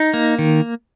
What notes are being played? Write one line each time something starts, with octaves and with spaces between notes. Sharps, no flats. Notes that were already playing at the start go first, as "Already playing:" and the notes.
Already playing: D#4
A#3
D#3